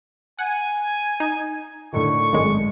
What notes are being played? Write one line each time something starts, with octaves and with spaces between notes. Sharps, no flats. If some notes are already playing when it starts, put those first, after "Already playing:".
F#5 G#5
D#4
A2 D3 D#3 C#6
G#1 F#2 G#3